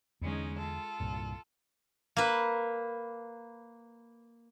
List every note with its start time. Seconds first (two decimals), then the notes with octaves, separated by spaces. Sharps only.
0.21 E2 D3 G#3 C#4 D#4
0.57 F4 A4
1.00 C2 G2 A#2
2.17 A#3 B4